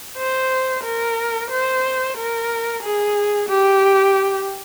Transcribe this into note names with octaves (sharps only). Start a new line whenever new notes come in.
C5
A#4
C5
A#4
G#4
G4